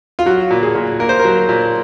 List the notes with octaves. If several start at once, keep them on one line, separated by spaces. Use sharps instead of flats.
F4
F#3 F#4
A#2
G#4
A#2
A#3 A#4
C5
A#4
F#3
A#2